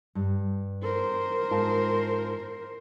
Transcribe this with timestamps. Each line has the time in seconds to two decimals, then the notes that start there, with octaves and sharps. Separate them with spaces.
0.15 G2
0.83 A#4 C5
1.51 G#2 F4 A5